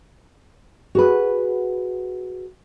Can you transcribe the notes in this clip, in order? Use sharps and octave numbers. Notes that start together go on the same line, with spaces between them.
F#4 G#4 B4